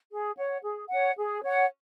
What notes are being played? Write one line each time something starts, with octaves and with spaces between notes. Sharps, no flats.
G#4
C#5 F#5
G#4
C#5 F#5
G#4
C#5 F#5